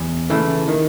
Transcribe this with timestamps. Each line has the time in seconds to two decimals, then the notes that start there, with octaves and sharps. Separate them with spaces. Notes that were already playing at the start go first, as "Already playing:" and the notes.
Already playing: E2
0.30 C#3 E3 A3
0.68 D#3